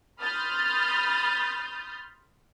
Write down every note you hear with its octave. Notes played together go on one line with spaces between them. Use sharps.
B5 C6 D#6 F6 G6 A6